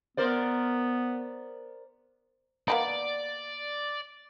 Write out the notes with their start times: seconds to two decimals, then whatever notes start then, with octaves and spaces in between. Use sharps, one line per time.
0.17 B3 A#4 C5 D5
2.68 A#3 B3 D#4 D5